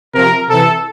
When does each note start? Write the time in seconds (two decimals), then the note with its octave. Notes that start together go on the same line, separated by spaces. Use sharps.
0.14 C3 F3 A#4
0.49 C3 E3 A4